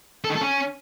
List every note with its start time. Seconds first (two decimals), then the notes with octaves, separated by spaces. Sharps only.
0.24 A4
0.30 D#3
0.36 A4
0.41 C#4